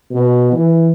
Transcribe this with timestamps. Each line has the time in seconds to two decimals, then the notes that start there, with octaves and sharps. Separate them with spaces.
0.11 B2
0.52 E3